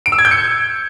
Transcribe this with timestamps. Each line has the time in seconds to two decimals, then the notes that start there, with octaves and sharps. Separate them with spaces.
0.06 D7
0.12 E6
0.19 G#6
0.25 G6
0.31 C#7